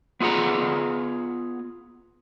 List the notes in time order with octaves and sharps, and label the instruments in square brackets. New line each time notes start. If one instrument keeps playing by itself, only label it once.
[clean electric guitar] B3 F4 G#4 F#5 A#5